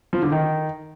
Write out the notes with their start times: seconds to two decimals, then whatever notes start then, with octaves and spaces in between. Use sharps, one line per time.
0.13 F3
0.22 D3
0.32 D#3